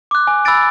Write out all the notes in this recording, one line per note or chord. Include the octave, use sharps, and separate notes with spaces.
D6 F#6
G#5
B5 E6 A6 D7